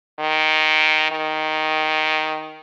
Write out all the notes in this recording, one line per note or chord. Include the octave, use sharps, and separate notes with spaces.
D#3
D#3